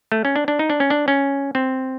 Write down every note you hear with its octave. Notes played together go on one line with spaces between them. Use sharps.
A3
C#4
D4
D4
D#4
D4
C#4
D4
C#4
C4